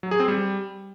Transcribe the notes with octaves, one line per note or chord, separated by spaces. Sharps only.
F#3
G#4
C4
G3